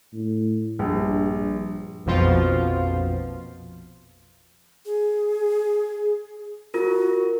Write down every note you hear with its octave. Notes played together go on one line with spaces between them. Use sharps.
A2
A#1 G2
A#1 F2 B2 F3 F4
G#4
F4 F#4 A#4